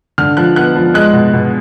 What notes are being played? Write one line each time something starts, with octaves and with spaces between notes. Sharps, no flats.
D3 F6
F3 F#6
B3 F#6
F3
G#3 F#6
B2
B2